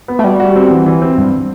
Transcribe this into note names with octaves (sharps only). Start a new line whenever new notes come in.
B3
A3
G3 F#4
F#4
C4
E3
E3
C4
G2